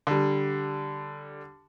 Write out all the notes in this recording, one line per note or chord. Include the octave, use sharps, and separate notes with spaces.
D3 G3